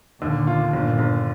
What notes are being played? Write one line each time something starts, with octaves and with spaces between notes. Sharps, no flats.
D#2 A#2 D3
F4
G1 G2 A#2
G1